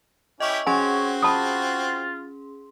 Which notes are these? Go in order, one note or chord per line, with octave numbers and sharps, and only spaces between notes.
C#4 E4 G4 D#5 C#6
C4 C#4 F#4 G#4 C#5 G#5 C6
F4 A5 B5 D#6